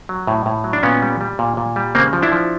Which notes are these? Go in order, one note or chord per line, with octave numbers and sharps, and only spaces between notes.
F#3
A2
A2
F#3
D4
A#2 B3 C#4
G3
G3
A#2
A#2
G3
C#3 A#3 C4
F3
D4 E4
F3